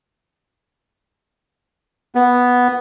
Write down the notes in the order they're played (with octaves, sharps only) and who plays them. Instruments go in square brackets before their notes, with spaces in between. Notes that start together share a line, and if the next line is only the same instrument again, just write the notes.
[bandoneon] B3